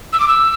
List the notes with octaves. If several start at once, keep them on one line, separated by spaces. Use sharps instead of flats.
E6
D6
E6